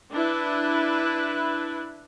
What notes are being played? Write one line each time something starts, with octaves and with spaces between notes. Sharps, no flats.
D4 E4 B4